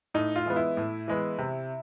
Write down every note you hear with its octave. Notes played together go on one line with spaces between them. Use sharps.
A2 D#4
F4
E3 G#3 B3
E4
A2
E3 G#3 B3
C3